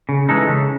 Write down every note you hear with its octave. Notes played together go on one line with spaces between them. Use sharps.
C#3
E3 G#3 D#4 A4
C#3